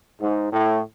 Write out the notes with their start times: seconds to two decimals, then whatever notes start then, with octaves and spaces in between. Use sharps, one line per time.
0.21 G#2
0.52 A2